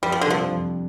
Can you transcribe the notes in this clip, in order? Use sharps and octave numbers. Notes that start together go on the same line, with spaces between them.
F2 G3
F3
D3
C3 F3 G3 D4
F2